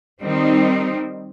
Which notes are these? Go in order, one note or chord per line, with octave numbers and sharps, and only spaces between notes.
D#3 G3 C4 D#4